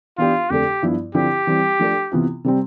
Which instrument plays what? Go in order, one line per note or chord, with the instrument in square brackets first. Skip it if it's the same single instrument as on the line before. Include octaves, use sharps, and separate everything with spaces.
[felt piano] E3 B3 D4 G4 [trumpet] F4
[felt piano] F2 D3 A3 D4 A4 [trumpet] G4
[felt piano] G2 F3 B3 E4
[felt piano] D3 F3 C4 E4 [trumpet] G4
[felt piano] E3 G3 C4
F3 A3 D4 A4
C3 E3 B3 F4
C3 G3 C4